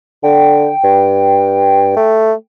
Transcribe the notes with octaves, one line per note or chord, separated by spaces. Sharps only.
D3 G5
G2
A3